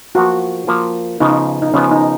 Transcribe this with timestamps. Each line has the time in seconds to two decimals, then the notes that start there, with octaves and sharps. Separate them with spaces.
0.15 F3 A#3 F4 F#4
0.67 F3 A#3 F4
1.20 C#3 F3 B3 D#4
1.62 D#4
1.74 C#3 F3 B3 C#4
1.91 D#4